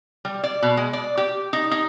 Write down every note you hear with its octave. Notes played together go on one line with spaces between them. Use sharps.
G3
D5
B2
G#3
D5
G4
D#4
D#4